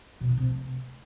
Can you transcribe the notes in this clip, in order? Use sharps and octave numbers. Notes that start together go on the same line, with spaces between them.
B2
D3
C3
A3